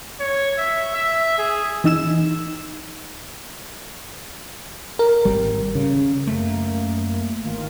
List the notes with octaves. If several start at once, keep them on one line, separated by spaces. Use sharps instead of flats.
C#5
E5
E5
G#4
E3 D#4 E6 E7
A#4
G#1 G3
C#3
F#2 A3 A#3
G1 D#3 F4